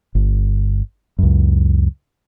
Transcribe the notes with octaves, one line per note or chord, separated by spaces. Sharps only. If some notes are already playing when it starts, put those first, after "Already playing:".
G1
C#2 F#2